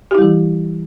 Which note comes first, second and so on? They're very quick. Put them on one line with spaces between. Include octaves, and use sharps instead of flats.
G4 E4 G3 E3